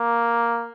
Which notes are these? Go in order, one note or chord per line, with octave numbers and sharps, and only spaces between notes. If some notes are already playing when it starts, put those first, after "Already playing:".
Already playing: A#3